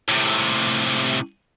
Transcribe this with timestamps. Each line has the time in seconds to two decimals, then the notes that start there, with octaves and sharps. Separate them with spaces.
0.08 A2 C3